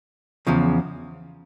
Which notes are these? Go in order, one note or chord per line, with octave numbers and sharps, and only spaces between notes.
E2 C#3 F3